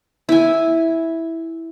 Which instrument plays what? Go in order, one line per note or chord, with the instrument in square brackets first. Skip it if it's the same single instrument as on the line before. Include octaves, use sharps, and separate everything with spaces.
[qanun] E4 G#5